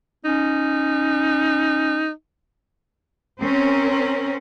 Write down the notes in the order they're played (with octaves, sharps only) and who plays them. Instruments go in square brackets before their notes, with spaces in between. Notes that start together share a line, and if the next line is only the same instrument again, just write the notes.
[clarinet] C#4 [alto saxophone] D#4
[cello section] C4 C#4 A#4